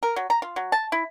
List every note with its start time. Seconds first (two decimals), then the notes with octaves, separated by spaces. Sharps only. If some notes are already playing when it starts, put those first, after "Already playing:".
0.03 A#4
0.16 F#3
0.30 A#5
0.42 F4
0.56 F#3
0.72 A5
0.92 E4